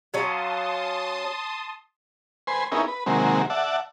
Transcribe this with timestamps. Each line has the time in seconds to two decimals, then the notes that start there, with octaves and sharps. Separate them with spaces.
0.14 F#3 C#4 F5 A5 C6 D#6
2.47 B4 C5 G#5 C6
2.72 B3 C#4 D#4 E4 G#4 A#4
2.88 B4
3.06 C3 D#3 F#3 G#3 A#3 C4
3.50 D5 E5 F#5 A5